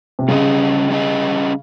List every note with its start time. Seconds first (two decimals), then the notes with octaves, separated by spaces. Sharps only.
0.19 C3
0.28 C#3 G3 C#4 G#4 D#5
0.90 G3 C#4 G#4 D#5